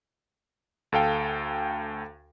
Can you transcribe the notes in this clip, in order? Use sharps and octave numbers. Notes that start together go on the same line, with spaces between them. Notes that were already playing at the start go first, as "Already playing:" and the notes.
D2 A4 F5 G5